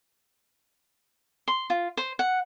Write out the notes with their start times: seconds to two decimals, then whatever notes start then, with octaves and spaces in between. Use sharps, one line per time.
1.48 C6
1.70 F4
1.97 C5
2.19 F#5